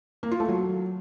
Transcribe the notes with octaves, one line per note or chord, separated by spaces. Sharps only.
A#3
F4
A3
F#3